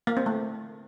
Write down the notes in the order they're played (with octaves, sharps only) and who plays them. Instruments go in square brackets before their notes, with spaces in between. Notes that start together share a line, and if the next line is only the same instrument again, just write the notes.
[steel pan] A#3
C4
A3